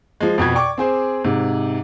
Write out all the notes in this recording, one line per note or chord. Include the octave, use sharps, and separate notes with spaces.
F3 G#3
F2 B2 B4 G#6
D5 G5 C#6 D6
C4 G#4 C5
G#2 C3